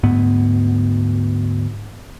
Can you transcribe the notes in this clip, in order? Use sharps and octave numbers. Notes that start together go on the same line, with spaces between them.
D2 G#2 B3